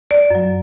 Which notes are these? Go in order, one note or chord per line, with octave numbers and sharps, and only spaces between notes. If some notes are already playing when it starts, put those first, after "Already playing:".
D5
F#2 F#3